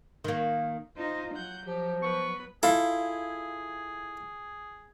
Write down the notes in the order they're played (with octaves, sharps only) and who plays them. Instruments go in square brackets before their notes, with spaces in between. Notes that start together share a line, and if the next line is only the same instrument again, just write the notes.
[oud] D#3 A#3
[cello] D#4 F4 [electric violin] C5
[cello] F#3 [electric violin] F#5 G6
[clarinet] F3 [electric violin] G4
[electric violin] B3 B4 [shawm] C#6
[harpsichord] E4 A4 [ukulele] F4 F5 [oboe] G#4